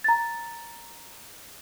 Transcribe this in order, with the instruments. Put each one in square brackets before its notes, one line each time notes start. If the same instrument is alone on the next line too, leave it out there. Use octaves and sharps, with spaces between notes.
[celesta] A#5 A6